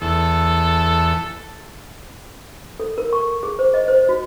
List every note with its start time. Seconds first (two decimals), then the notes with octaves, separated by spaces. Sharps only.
0.02 E2 A4
2.80 A4
2.98 A#4
3.13 C#6
3.43 G#4
3.59 C5
3.74 D#5
3.88 C5
4.09 F#4